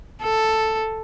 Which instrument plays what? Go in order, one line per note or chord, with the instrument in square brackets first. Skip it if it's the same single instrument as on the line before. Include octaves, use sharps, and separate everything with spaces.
[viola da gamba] A4